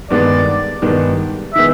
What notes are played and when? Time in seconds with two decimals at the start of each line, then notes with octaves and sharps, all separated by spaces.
0.11 G2 D#3 G#3 B3 D5
0.82 G2 D#3 G#3 B3
1.54 D#3 G#3 B3 E5